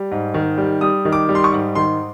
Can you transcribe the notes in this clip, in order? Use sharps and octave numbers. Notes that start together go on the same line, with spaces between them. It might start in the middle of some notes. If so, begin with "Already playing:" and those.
Already playing: G3
G#2
D#3
G3
G3 D#6
D#3
D6
G3
C6
C#6
G#2
D#3 C6